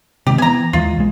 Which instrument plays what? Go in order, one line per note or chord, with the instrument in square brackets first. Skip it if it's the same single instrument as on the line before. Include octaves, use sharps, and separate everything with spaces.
[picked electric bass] C3 D#3 G#3 [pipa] G4
[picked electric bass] E3 B3 [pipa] G#5 A#5
[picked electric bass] D#2 E3 G#3 [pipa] F4
[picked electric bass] B1 G#3